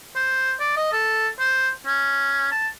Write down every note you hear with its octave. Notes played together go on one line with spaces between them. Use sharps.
C5
D5
D#5
A4
C5
C#4
A5